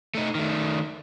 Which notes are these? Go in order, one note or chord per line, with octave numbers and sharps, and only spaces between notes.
A3 D#4
D#3 A3